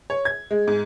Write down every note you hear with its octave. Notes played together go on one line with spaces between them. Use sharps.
C#5
G#6
G#3
G#2